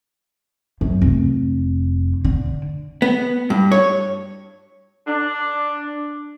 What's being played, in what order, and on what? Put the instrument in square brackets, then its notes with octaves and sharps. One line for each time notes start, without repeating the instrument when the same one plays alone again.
[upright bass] F#2
F1
D3
[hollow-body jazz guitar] B3
G2
C#5
[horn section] D4